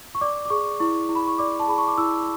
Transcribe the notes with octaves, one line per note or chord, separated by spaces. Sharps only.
C#6
D5 D6
D6
G#4 C#6
E4 C#6
E4
B5
C#6
D5 D6
A5
G#4 B5
C#6
D6
E4 E6